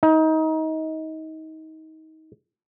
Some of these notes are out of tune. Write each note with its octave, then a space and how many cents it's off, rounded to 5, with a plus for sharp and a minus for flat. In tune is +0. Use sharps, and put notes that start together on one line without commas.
D#4 +25